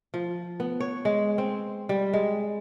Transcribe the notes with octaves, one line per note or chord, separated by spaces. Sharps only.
F3
B3
C#5
G#3
C4
G3
G#3